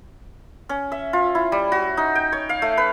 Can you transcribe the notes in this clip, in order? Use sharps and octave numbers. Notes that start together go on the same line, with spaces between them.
C#4
E5
F4
E4
G3
F#4
D#4
G5
C#5
F5
A3
B4